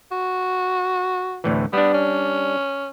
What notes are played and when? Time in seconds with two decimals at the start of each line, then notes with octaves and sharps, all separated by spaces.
0.12 F#4
1.44 D2 A2 E3
1.73 G3 B3 D4
1.94 C#4